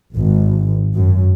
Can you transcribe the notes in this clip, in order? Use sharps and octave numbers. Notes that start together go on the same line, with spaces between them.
G#1
F#2